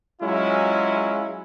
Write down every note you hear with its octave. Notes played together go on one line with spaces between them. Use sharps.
F#3 G#3 C#4 E4 F4